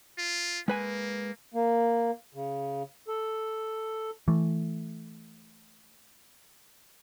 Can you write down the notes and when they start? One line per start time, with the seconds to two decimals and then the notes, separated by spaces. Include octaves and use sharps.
0.18 F4
0.68 G#3 A#3 B4 G#5
1.54 A#3
2.34 C#3
3.08 A4
4.28 E3 A3